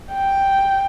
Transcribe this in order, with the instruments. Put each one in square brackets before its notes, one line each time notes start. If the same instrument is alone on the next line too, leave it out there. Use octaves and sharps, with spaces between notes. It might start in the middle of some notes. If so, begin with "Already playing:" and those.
[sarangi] G5